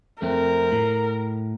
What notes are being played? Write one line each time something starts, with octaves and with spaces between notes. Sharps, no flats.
F2 A3 C4 A#4
A2